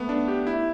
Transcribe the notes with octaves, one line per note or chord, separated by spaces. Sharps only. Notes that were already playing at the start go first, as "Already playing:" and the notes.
Already playing: A3 B3
D4
G4
E4